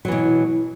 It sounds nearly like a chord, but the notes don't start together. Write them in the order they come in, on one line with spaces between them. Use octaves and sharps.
F#3 E3 B2